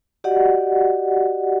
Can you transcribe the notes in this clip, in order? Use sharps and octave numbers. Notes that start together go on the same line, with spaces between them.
F#4 G4 D5 D#5 F#5